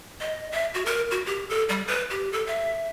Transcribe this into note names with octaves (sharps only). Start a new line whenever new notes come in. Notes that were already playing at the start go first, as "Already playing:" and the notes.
D#5
E5
F#4
A#4
F#4
G4
A4
G3
B4
G4
A4
E5